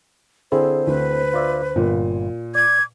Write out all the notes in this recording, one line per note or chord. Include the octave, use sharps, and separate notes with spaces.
D3 C4 E4 G#4 C5
D2 B4
F4 D5 E5
G1 A#2
D5 D6 G#6